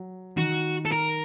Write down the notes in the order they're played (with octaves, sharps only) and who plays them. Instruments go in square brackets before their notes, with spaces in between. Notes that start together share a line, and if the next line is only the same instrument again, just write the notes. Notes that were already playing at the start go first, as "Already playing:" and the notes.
Already playing: [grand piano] F#3
[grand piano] D#3 [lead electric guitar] F#4
[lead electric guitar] A4
A#4